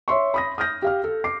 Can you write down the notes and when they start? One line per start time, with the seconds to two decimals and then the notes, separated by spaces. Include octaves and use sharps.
0.08 C#5 E5 C6 C#6
0.34 B5 D#6 A#6
0.58 D#6 F6 G6 A#6
0.82 G4 F5 F6
1.04 A4
1.24 D6 C7